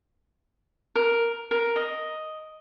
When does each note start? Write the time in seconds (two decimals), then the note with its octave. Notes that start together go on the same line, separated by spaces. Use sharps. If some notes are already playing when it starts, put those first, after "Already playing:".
0.95 A#4
1.51 A#4
1.76 D#5